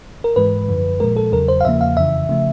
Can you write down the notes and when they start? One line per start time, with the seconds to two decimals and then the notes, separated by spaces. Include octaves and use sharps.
0.24 A#4
0.36 G#2 E3 G#3 B4
0.68 F#2 D3 F3
1.00 A#2 F3 G#3 A#4
1.17 A4
1.32 E2 C#3 F#3 A#4
1.48 C5
1.61 F5
1.65 E2 C#3 F3 A#3 E5
1.81 F5
1.97 F2 C#3 E3 E5
2.29 C#3 F3 A3